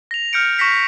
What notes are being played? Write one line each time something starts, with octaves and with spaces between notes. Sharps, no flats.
A#6 F7
F6 G6 C#7 D7
C#6 F6 A#6 B6 C#7